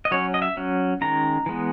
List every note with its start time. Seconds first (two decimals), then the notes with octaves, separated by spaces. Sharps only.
0.05 D#5
0.11 F#3 C#4 C#5
0.34 D#5
0.42 E5
0.57 F#3 C#4
1.01 D#3 G#3 C#4 A#5
1.46 E3 G#3 B3